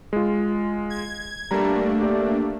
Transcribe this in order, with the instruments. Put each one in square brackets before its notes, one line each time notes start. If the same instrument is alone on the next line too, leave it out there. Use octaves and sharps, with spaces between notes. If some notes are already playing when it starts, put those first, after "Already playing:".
[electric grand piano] G#3 F4
[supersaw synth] G#6
[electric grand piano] G3 A#5 [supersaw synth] A3 A#3 D4
[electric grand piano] G4 D5 E5